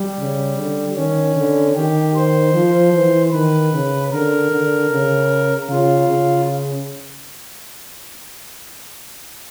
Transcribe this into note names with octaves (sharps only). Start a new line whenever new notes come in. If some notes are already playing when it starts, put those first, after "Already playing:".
Already playing: G3
C#3
D3
D#3 C#4
D3
D#3 G4
C5
F3
E3
D#3 B4
C#3
D3 A#4
D3
C#3
C#3 F4
C#3